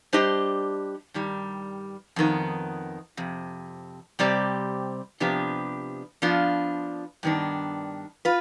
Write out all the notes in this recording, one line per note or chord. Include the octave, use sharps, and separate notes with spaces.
G3 D4 G4 C5 D#5
G2 D#3 G3
F2 D#3 B3
F2 C3
C3 G3 C4 G4 D5
C3 F3 B3 D4 G4
F3 B3 D4 F4
G2 D#3 B3 D4
F4 B4